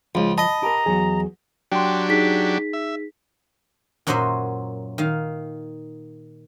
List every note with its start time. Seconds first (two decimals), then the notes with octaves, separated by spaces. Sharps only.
0.15 C#2 F3
0.38 D#5 A5 B5
0.63 G4 A#4 A#5
0.86 E2 F#3 F#4 G#4
1.72 F#3 D4 G4 G5 C6
2.09 D#4 G#4 B6
2.73 E5
4.07 F#2 A#2 F#3 C5 D#5 E5
4.98 D#3 F5